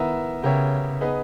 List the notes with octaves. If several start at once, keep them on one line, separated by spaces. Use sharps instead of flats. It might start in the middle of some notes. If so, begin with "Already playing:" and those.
Already playing: D#3 B3 E4 A#4 E5
C#3 B3 G4 A#4 C#5 E5
B3 D#4 G#4 B4